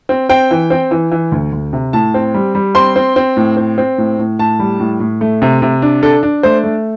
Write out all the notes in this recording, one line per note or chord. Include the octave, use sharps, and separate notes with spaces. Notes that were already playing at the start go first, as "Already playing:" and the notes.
C4
C4 G5
E3
C4
E3
E3
D2
D2
C3
A2 A5
C4
G3
G3
C4 C6
C4
C4
A2
C4
C4
A2
A2
A2 A5
G3
A2
A2
A3
C3
C3
D4
D4 A4
D4
A3 C5
A3